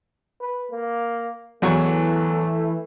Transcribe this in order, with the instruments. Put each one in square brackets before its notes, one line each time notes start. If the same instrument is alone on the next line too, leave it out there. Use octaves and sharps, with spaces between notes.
[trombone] B4
A#3
[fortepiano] E2 F#3 C#6 [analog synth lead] E3 [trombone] A3